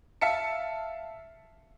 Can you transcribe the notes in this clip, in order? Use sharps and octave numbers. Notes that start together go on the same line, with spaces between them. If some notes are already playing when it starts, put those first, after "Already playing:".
E5 F5 A5 C#7